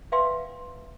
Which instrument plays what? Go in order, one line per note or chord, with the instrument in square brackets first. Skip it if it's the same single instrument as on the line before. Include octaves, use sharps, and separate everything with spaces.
[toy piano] B4 D5 E5 F5 G5 C6